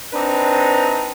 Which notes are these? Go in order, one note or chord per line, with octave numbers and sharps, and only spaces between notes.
C4 D4 D#4 B4 A#5